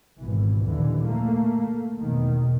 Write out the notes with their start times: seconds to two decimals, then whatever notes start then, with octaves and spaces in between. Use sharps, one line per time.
0.21 G#1 B2 E3
0.65 D#2 A#2 D3 E3
1.08 A3 A#3
1.99 E2 B2 D#3